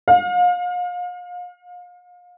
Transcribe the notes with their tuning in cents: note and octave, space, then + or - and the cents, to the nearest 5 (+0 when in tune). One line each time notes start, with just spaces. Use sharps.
F5 +35